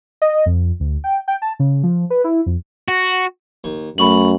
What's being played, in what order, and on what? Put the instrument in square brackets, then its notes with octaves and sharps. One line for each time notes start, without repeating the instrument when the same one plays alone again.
[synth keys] D#5
F2
D2
G5
G5
A5
C#3
F3
B4
E4
F2
[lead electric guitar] F#4
[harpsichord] D#2 C#6
[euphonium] F#2 [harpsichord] A3 G#5 A5 [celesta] B5 C#6 F#7